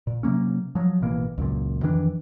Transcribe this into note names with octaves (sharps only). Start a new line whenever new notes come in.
A#2
C3 F#3 A#3 C#4
F3 F#3
A1 B2 E3 A#3
C#2 F#2 A#2
F2 D#3 E3 D4